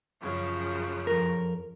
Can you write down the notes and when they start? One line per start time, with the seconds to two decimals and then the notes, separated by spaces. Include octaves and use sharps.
0.21 F#2 C#3 F3
1.07 F2 A#4